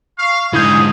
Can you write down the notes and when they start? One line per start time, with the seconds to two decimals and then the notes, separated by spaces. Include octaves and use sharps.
0.19 F5 C#6
0.53 G#2 D3 C#4 E4 G#4 D#6 G6